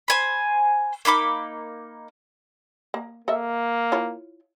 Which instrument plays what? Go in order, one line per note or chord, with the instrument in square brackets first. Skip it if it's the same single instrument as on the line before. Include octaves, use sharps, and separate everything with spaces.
[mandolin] C5 G#5 B5
A#3 D#4 B5 D6
[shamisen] A#3
[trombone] A#3 [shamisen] A4 D#5 E5
[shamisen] E4 F4 C#5